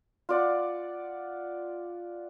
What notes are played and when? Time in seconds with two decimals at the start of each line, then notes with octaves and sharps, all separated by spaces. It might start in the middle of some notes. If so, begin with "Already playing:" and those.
0.29 F4 D5 F#5